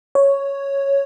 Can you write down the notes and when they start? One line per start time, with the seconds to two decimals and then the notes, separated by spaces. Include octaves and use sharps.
0.15 C#5